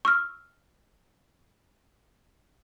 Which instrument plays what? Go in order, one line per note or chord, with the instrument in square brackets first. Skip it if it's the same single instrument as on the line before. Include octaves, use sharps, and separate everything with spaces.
[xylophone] C#6 E6 F6